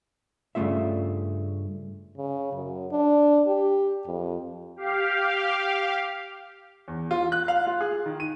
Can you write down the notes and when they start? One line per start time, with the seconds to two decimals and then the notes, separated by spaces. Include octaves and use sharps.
0.55 G2 C#3 F#3 A3 F4 E5
2.17 C#3
2.53 F#2
2.92 D4
3.47 G4
4.07 F2
4.76 G4 F5
6.88 E2
7.11 F4
7.32 F#6
7.48 F5
7.67 F4
7.81 G#4
8.06 D#3
8.20 D#7